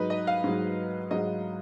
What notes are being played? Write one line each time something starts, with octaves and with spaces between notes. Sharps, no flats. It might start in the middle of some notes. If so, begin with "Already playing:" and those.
Already playing: G#2 F#3 D#4 B4
D#5
F5
G#2 F#3
G#2 F#3 D#5